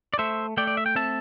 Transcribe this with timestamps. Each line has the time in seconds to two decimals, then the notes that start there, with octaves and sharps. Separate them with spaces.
0.14 D5
0.19 A3 C5 E5
0.57 A3 D5 G5
0.67 D5
0.77 E5
0.86 G5
0.95 C4 E5 A5